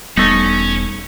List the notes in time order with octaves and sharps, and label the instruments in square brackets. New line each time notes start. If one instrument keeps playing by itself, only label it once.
[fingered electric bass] E1 G3 B3 [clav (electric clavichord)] A3 D#4 [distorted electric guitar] C#4